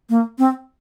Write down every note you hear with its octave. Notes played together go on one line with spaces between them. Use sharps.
A#3
C4